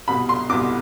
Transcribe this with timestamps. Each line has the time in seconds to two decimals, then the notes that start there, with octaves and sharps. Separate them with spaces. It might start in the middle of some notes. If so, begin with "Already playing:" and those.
0.08 C2 B2 B5
0.29 C6
0.49 C2 B2 D6